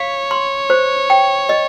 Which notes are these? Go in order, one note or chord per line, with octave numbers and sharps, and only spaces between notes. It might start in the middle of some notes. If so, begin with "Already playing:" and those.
Already playing: C#5 F5
C6
C5
G5
D#5